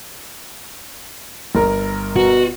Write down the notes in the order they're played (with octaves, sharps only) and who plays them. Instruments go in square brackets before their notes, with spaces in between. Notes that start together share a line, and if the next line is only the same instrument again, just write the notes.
[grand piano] G1 A#4
[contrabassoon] B2 [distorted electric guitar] F#4